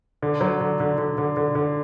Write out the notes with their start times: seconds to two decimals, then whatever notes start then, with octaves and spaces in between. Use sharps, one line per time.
0.22 D3
0.41 F#3
0.61 D3
0.80 D3
0.98 D3
1.18 D3
1.37 D3
1.55 D3